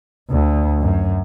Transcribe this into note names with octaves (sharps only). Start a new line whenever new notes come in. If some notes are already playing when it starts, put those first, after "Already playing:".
D2
F#2